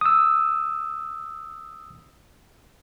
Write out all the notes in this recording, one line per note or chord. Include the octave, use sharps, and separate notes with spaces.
D#6 E6